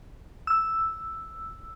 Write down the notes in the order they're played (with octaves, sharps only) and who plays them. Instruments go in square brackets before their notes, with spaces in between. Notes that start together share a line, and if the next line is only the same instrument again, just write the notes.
[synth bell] E6